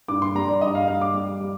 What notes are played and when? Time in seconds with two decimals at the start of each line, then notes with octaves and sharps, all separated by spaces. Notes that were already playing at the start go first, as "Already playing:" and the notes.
0.08 G2 D6
0.22 C6
0.35 G3 A#5
0.48 D5
0.61 G2 D#5
0.75 F5
0.88 G2 F5
1.01 D6
1.14 G3
1.41 G3